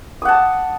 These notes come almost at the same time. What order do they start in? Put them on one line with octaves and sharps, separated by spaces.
D#6 F#5 A5